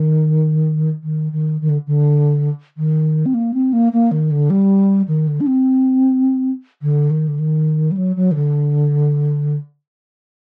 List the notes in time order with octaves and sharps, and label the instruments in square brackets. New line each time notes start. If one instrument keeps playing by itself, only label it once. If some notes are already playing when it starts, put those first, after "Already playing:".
Already playing: [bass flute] D#3
D#3
D#3
D#3
D3
D3
D#3
C4
A#3
C4
A#3
A#3
D#3
D3
G3
D#3
D3
D4
C4
D3
D#3
D3
D#3
G3
F#3
F#3
D#3
D3